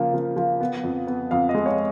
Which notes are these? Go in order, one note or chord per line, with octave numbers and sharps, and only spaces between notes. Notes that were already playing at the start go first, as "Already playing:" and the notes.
Already playing: C#3 F3 A#3
F3
F3
B3
F2
B3
F2 F5
D#5
G#3
C#5